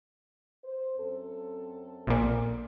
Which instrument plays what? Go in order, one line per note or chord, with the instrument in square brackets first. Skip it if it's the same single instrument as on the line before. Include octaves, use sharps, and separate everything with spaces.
[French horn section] C5
F#2 C4 A4
[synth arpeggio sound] A#1 A#2